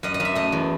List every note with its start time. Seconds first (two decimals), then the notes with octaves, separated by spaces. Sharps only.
0.03 F#2 D#5
0.14 D#5
0.20 F#2
0.25 E5
0.35 A3 D#5
0.52 E2